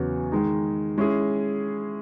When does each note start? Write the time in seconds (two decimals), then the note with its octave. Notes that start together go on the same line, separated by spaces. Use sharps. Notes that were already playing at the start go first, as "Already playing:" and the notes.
Already playing: E2 C#3 F#3 B3 F#4
0.32 D#3 G#3 D#4
0.98 G#3 C#4 E4 G#4